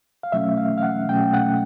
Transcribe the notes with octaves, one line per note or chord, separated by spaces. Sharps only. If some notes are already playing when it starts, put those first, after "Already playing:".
F5
B2 F#3 A3 C#4 E5
F5
F5
F#5
B2 F#3 A3 C#4 G5
F#5